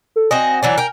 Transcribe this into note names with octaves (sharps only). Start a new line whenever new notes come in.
A4
C4 F#4 D#5 G#5
E3 F#3 D4
A#4 G5